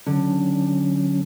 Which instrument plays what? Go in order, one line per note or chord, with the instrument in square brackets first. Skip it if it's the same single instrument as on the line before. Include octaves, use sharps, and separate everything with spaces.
[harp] D3 [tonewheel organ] F#3 C#4